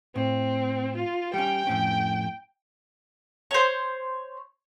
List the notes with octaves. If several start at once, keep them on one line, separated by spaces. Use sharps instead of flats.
A2 C4
F4
G3 C#4 G5
F2 A2 C#4
C5 C#5